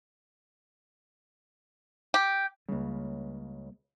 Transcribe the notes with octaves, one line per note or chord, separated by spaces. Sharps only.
G4
C#2 C#3 G3 A#3